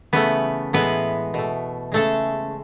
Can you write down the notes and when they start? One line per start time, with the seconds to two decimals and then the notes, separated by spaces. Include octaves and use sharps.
0.13 C#3 E3 A3 B3 B4
0.73 A2 E3 G#3 B3 B4
1.34 B2 A3
1.92 C#3 G#3 A3 A4